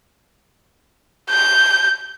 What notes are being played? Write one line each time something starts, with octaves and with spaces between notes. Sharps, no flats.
G6